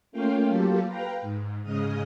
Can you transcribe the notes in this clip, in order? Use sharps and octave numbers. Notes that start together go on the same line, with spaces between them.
A3 A#3 C#4 F4 F5 G5
F#3 A#3 F4 G4 A4
B4 F5 G5 A#5
G#2
G#2 C#3 G#3 D#5 D#6 F6